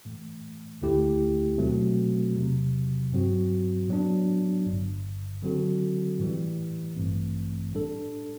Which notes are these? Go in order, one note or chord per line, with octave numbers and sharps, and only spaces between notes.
A2 E3 A3
D2 D3 A3 E4 G4
B2 F#3 A3 C4 F#4
E2 C3 F#3
G2 F#3 C4 F#4
A2 F#3 B3 D4
G1 G2 D3
D3 F#3 C4 F#4 A4
A2 E3 G3
A1 G2 E3 A3 C4
A2 G3 D4 A4